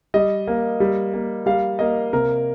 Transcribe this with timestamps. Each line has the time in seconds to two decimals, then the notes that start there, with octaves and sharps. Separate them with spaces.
0.14 G3 D#5
0.47 A#3
0.80 G3
1.14 A#3
1.46 G3 F5
1.79 A#3 D#5
2.13 C3 A#4